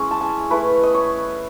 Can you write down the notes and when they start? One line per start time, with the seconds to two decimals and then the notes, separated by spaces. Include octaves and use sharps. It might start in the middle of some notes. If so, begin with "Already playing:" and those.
Already playing: G#3 C#4 E4
0.11 A5
0.21 G#5
0.51 A3 E4 B4
0.83 D#5
0.94 C#5